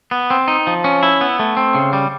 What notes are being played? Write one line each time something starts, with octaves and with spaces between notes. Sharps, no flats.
B3
C4
D#4
F3
C#4
E4
B3
A3
C4
C#3
G3